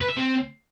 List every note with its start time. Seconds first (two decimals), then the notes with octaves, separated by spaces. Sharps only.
0.01 B4
0.09 E5
0.17 C4